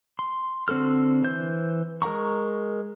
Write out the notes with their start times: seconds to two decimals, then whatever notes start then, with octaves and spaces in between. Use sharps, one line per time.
0.19 C6
0.68 D3 C4 F#4 A4 F6
1.24 E3 C5 G6
2.02 G#3 A#4 F#5 A#5 C#6